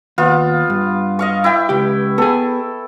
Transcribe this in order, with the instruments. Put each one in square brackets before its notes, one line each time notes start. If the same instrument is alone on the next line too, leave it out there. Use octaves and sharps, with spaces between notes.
[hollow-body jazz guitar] D#2 [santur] B3 F4
[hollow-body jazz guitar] G2
[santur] D#5 F5 C#6
E4 G5
[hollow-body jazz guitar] C#2 G4
[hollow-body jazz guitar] B3 G#4 [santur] A4